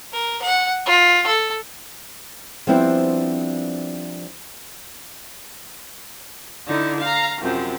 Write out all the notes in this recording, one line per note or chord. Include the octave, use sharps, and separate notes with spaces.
A#4
F#5
F4
A4
F3 G3 B3 C4 D4 E4
D3 D#4 E4
F5 A#5
F#2 C3 F3